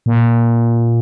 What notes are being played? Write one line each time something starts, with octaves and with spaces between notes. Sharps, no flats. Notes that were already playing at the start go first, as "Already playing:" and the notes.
A#2